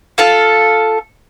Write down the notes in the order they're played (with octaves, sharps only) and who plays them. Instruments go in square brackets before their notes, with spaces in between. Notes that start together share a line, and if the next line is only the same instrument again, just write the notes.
[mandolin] F4 A4 F5